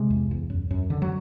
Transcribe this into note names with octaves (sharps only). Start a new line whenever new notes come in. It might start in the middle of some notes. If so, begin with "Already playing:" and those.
Already playing: C3 G#3
E2
E2
F#2
F#2
D3
F#3